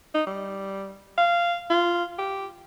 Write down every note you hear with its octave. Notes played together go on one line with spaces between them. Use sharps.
D#4
G3
F5
F4
G4